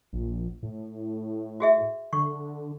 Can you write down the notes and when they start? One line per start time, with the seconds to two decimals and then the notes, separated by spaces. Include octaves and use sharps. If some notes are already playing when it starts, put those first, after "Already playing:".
0.13 A#1
0.63 A2
1.60 F#4 G#4 E5
2.13 D3 C#6